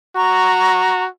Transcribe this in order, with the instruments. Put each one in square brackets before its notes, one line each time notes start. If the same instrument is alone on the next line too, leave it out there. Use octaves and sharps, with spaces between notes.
[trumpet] F#4 [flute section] A#5 C#6